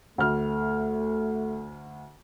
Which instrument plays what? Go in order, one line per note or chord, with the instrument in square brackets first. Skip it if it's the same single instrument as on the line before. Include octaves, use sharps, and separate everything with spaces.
[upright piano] D2 F6 [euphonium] A3